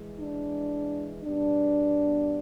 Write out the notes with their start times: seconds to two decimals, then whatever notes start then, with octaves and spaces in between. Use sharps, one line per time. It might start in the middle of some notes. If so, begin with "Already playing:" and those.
Already playing: E3 G#3
0.20 D4
1.23 B2 G3 B3 D4